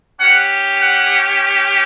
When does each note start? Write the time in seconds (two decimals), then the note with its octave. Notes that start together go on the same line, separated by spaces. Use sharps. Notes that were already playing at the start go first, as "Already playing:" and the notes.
0.19 C#4 G4 F#5
0.80 F#5